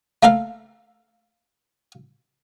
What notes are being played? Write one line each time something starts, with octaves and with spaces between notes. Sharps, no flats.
A3 A#3 A4 A#4 F5